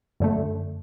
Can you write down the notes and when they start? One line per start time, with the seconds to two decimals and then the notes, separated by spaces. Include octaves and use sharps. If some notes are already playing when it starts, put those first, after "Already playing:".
0.20 F#2 D3 A3